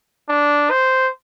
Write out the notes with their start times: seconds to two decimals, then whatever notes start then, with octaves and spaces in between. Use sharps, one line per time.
0.29 D4
0.71 C5